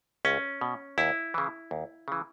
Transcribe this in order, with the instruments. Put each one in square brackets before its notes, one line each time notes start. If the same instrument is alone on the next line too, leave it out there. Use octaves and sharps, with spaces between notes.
[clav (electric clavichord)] C#2 C#4
B2
D#2 E4
C#3 E3
D#2
C#3 E3